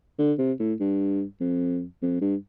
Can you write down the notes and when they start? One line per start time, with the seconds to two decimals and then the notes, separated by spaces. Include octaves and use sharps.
0.19 D3
0.38 C3
0.60 A2
0.80 G2
1.41 F2
2.02 F2
2.21 G2